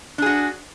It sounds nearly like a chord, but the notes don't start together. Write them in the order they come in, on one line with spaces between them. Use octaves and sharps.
D4 G#4 F#4